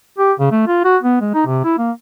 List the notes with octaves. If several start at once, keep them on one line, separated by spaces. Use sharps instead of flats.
G4
C#3
A3
F4
F#4
B3
G#3
D#4
C3
E4
A#3